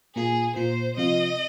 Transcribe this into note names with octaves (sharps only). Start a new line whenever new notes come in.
A#2 A#3 F4 G#4
A#2 A#3 F4 C5
C3 F3 C4 F4 D#5